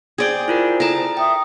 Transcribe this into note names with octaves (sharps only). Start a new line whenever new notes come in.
G#4 C5 D5 G5
E4 F4 A#4
A4 A#4 A5
E5 G5 D#6